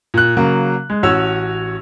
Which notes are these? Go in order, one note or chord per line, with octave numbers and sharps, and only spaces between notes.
A#2 F#6
C#3 F#3 A#3
G#3
A1 F#4 C#5 E6